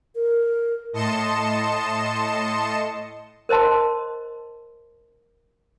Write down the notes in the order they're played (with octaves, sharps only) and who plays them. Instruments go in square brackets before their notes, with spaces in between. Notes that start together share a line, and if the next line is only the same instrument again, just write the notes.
[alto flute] A#4
[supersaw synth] A2 D#5 A5 C6 C#7 E7
[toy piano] A#4 C5 D#5 A5 C6